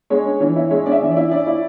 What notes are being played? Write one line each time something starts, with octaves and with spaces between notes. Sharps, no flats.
G#3 C#5
C#4
E3 C#5
E4
G#3 C#5
C#4 D5
E5
E3
D5
E4
C#4 D5
E4